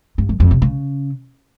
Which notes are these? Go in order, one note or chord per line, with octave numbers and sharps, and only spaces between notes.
G2
F#2
F2
C3
C#3